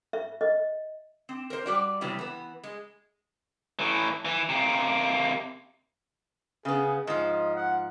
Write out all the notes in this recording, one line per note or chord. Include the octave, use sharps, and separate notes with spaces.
E5
D#5
C4
A#4 C5
G3 F#4 D5
C3 E3 F#3 G3 B3 C4
E3 B3
G#3
A2 E3
E3
C3 A#3
C#3 B3 G#4
G#2 F3 D#5
F#5